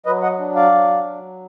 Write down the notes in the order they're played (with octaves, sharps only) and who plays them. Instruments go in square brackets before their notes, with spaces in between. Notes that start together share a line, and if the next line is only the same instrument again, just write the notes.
[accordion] F#3 B4 D#5
D#5 F#5
D4
D5 F5
F#3
F#3